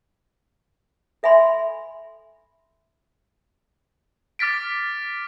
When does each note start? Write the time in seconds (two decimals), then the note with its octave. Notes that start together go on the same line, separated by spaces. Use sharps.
1.23 A4 E5 G#5 B5 C6
4.39 D6 F6 A6 B6 D7